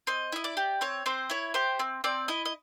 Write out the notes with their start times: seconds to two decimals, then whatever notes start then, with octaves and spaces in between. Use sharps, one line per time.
0.07 C4 D#5
0.32 E4 D#5
0.44 D5
0.57 G4
0.81 C4 C#5
1.06 C4 C5
1.30 E4 C#5
1.54 G4 C5
1.79 C4
2.04 C4 D5
2.28 E4 D#5
2.45 D#5